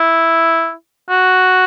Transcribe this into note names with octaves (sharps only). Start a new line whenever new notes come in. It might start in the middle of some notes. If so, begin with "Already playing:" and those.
Already playing: E4
F#4